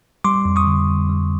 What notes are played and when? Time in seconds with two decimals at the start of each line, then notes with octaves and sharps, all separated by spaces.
0.24 G3 C6 D6
0.45 F2
0.56 C#6 D#6
0.67 D3
0.87 F2
1.09 G3